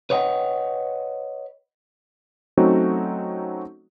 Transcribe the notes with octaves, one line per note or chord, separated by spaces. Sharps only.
B4 C#5 D#5 F#5 G5
F#3 A3 C4 C#4 D#4 F#4